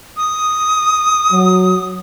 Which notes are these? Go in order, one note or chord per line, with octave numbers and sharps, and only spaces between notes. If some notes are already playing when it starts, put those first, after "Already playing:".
D#6
F#3